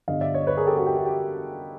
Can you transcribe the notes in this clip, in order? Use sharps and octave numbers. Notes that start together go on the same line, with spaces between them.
G1 G2 D3 D#5 F5
D5 E5
C#5 D#5
B4 C#5
G#4 A#4
G4 A4
F#4 G#4
G4
F#4
G4